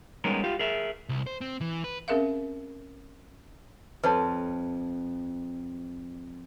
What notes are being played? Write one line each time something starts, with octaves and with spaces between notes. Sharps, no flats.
G3 G#3 B3 C#4 D#4 A#4
F4 G4 F5
G#4 A#4 E5
C2
C5
C4
E3
B4
C4 C#4 G#4 A#4 E5 F5
F2 B4 C#5 A5